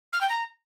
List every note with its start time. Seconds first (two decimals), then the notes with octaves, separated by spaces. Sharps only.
0.13 F6
0.21 G5
0.29 A#5